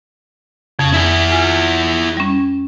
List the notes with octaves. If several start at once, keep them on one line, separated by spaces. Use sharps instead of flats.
F2 C#3
E4 G#4
F4 G#5
G3 C#4